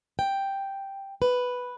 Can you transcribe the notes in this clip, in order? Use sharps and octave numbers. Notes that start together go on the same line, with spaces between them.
G5
B4